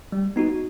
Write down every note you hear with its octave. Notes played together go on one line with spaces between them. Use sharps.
G3
B3 D#4 F#4